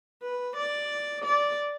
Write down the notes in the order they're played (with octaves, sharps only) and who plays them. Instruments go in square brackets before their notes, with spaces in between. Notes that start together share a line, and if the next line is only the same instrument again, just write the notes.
[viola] B4
D5
D5